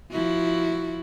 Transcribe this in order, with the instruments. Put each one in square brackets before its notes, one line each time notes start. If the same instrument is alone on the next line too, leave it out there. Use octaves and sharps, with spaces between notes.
[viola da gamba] F3 E4 F#4